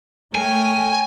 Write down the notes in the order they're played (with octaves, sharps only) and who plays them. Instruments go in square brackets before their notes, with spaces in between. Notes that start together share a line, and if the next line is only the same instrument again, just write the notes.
[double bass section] A3 [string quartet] A#4 C#5 G5 [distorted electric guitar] G#5